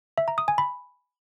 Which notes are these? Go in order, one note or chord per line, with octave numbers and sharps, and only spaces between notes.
E5
A#5
D#6
G#5
B5